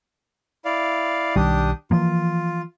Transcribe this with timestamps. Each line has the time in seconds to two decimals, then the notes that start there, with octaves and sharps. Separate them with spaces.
0.65 E4 D5 F5
1.36 B1 D#3 G3 D4 G4 D#6
1.91 E3 F3 A#3 F4